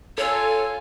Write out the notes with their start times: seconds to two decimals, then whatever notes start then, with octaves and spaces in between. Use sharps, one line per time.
0.18 F4 A4 C#5 G#5